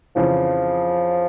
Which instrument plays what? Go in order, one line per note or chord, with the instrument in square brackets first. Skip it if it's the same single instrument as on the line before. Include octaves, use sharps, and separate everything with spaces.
[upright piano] F2 C#3 E3 [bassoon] F3